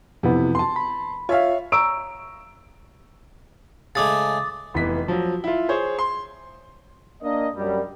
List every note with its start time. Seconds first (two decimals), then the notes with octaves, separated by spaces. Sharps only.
0.23 F2 C3 E3 B3
0.55 A5 C6
0.76 B5
1.29 F4 C#5 E5 F5
1.72 A#5 C#6 E6 D7
3.95 C#3 G#3 A3 D6 D#6 A6
4.74 F1 E3 B3 B6
5.08 F3 F#3
5.44 E4 F4
5.68 G#4 C5 C#5
5.99 C6
7.23 A#3 D4 D#5
7.56 F#2 G3